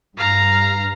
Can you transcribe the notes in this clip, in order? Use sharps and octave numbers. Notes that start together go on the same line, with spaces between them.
G2 F5 A#5